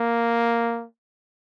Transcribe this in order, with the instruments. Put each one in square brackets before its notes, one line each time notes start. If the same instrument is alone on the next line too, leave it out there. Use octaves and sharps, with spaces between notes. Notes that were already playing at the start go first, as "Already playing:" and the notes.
Already playing: [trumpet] A#3